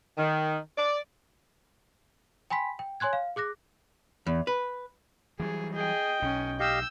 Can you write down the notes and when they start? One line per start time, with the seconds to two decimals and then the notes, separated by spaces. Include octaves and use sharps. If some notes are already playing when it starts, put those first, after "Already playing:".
0.18 D#3
0.77 D5
2.50 G5 G#5 B5 C6 B6
2.79 G5
3.00 C#5 G#5 C6 F#6 G#6
3.13 F5
3.36 G#4 D6 F#6 A#6
4.26 E2
4.47 B4
5.40 E3 F#3 G3 G#4
5.74 G#4 D#5 G5
6.22 B1 C#4
6.60 G4 D#5 F5 E6 G6